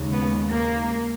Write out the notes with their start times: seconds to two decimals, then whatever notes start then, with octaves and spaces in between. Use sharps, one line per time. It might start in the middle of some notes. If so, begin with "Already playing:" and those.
Already playing: D#2 C#3 G#3
0.13 B3
0.48 A#3